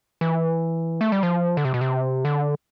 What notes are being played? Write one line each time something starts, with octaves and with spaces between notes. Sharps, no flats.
E3
A3
G3
F3
D3
C3
B2
C3
D3